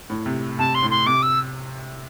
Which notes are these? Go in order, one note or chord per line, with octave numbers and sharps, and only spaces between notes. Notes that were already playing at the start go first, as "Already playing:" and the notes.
A2
C3
C3 A5
C6
A2
C6
C3 D6
E6